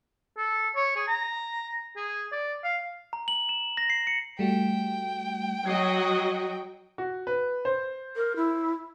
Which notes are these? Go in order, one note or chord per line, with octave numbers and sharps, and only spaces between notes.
A4
C#5
G#4
A#5
G#4
D5
F5
A#5
F#7
E7
A#6
C7
C#7
G3 A3 F#4 G5
F#3 F#4 D#5 G#6 C7
F#4
B4
C5
A#4
E4